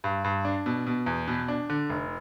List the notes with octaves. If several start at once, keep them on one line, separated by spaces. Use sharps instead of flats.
G2
G2
D4
B2
B2
E2
B2
D4
D3
F1